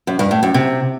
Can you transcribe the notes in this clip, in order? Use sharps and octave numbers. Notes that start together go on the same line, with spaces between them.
F#2
G2
A2
F#2
C3